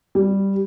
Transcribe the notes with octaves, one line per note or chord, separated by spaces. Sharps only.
G3